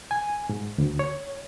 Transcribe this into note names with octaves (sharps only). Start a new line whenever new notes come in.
G#5
G#2
D2
C#5